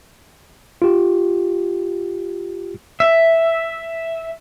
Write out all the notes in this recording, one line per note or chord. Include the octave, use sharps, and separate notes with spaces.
F4 G4
E5